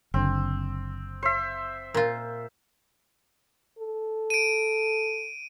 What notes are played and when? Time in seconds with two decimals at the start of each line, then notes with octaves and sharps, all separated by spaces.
0.14 F#1 D3 C4
1.23 C5 E5
1.94 A#2 F4
3.79 A4
4.30 D7 D#7